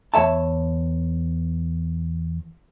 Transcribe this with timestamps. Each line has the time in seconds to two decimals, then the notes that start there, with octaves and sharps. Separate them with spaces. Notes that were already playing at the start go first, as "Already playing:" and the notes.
0.14 E2 C#5 E5 A5